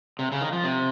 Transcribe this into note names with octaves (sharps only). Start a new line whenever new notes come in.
C3
C#3
D#3
F3
C3